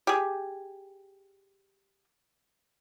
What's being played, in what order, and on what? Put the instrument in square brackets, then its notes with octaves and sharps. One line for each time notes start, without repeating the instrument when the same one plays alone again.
[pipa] G4 G#4